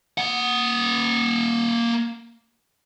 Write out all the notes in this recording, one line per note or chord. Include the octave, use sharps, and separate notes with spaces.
A#3 F#5